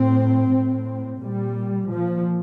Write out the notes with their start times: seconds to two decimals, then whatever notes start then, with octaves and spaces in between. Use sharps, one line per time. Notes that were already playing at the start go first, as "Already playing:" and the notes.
Already playing: A2 C4
0.54 A2
1.22 A#2 G3
1.90 A#2 F3